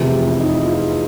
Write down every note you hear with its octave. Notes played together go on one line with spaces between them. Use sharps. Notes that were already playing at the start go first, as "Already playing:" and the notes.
Already playing: F1 E2 C3 F3
G4
E4
D#4
E4
F4